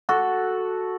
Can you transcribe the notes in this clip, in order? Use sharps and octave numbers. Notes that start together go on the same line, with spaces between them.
F#4 A4